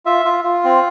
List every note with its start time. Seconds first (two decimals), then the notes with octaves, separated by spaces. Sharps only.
0.06 F4 E5
0.25 F4
0.44 F4
0.64 C4